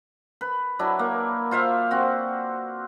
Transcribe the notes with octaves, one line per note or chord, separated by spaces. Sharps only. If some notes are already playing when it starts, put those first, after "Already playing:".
B4
F#3 D4 E4
A#3
F4 C5 E5 F5
C4 F#4